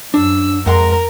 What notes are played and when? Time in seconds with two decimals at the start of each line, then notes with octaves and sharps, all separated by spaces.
0.14 F#2 D4 E6
0.66 F2 G#2 A#4 F#5 A#5 C6